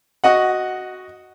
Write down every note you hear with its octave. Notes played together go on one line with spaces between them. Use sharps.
F#4 D#5 F#5